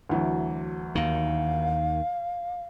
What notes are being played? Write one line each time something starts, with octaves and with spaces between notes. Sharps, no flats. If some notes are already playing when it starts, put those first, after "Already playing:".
D2 E3 F#3
D#2 D#3 F5